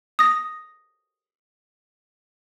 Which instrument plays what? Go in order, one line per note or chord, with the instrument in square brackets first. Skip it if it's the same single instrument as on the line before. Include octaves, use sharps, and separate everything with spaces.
[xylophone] D#6 A#6